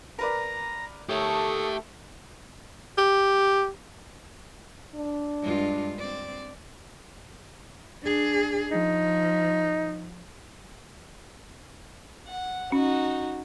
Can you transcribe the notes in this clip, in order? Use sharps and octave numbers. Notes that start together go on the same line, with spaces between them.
A#4 B4 D5 A#5
A3 G4 A4 A#4 C#5 C#6 D#6
G4
D4
G2 G#3 F4
C4 D5
D4 G#4
F3 D#4
F#5
C#4 D#4 F#4